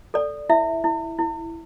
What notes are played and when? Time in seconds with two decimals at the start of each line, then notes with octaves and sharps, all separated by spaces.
0.14 A4 D5
0.49 E4 E5
0.84 E4
1.19 E4